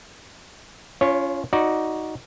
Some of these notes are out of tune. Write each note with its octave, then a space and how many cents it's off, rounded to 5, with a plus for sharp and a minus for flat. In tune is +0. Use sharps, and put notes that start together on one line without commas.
C#4 +25 F4 -20 C#5 -15
D#4 +10 F#4 -5 D5 +0